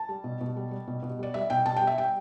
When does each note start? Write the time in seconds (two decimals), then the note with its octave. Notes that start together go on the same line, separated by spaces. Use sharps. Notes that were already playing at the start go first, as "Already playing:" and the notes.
Already playing: A5
0.09 G3
0.24 B2
0.41 B2
0.57 G3
0.71 G3
0.88 B2
1.03 B2
1.19 G3 D5
1.34 G3 E5
1.50 B2 G5
1.66 B2 A5
1.76 G5
1.82 G3
1.87 E5
1.98 G3 G5